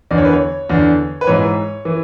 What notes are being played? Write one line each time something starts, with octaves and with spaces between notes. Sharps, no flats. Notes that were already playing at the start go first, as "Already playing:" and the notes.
E2 D3 D5
C#5
B4
C#5
E2 D3
B4
G#2 E3 C#5
E3